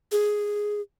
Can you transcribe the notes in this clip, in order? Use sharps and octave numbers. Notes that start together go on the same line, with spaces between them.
G#4